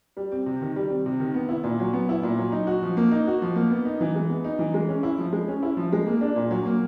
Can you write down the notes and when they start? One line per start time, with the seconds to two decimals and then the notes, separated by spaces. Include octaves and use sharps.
0.17 G3
0.32 C4
0.46 C3
0.61 D#3
0.76 G3
0.90 C4
1.06 C3
1.20 D#3
1.34 B3
1.49 E4
1.64 A#2
1.80 F#3
1.94 B3
2.09 E4
2.23 A#2
2.38 F#3
2.52 D#4
2.67 F#4
2.83 F3
2.97 A#3
3.11 D#4
3.27 F#4
3.42 F3
3.55 A#3
3.70 B3
3.85 D#4
4.01 E3
4.15 G#3
4.30 B3
4.44 D#4
4.59 E3
4.74 G#3
4.88 C#4
5.03 E4
5.18 F3
5.33 G#3
5.48 C#4
5.63 E4
5.77 F3
5.93 G#3
6.06 A#3
6.21 D4
6.36 A#2
6.51 F#3
6.66 A#3